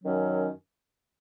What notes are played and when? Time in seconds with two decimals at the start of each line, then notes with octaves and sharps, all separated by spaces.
0.04 F#2 D#3 F#3 C#4